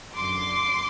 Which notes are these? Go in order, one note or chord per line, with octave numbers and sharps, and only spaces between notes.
F#2 D3 F#3 C6 D6